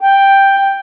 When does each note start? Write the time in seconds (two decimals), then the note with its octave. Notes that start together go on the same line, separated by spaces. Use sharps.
0.01 G5